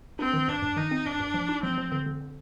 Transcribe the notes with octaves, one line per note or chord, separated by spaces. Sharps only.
C4 D4
D#3
G2 D4
G2
D#3 D#4
C4
G2 D4
G2
F3
D#4
F3 C4
F3
D3
D3
D3